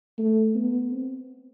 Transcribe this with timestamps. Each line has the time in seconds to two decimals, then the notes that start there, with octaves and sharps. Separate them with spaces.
0.18 A3
0.55 B3
0.91 C4